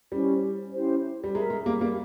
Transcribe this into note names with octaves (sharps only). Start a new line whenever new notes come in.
G3 C#4 E4 G4 C5
C#4 E4 G4 C5
G3
G#3 A#4 E5 A#5
G#3
G3 A#3
G3 A#3